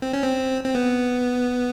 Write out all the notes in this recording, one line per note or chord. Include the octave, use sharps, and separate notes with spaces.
C4
C#4
C4
C4
B3